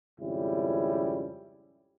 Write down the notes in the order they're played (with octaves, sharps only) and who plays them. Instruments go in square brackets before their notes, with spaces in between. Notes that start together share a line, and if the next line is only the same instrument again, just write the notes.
[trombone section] G#1 F2 C#3 G3 C#4 E4